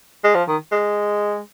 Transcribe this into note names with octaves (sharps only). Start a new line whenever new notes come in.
G#3
F3
D#3
G#3